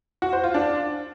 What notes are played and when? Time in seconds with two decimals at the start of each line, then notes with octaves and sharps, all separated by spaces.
0.22 F#4
0.33 C5
0.44 F4
0.54 D4